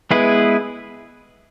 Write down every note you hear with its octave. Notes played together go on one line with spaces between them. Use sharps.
G#3 B3 E4 G#4 B4